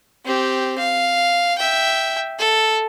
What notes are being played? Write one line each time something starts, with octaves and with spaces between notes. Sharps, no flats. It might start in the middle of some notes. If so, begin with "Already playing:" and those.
C4 G4
F5
E5 G5
A4